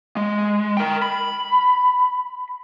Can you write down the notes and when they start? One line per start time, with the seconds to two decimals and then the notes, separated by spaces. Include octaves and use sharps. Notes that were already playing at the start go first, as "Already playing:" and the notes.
0.17 G#3
0.77 A#4 G5
1.02 B5